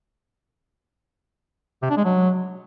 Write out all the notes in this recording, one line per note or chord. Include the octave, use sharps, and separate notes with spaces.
C3
D4
G#3
F#3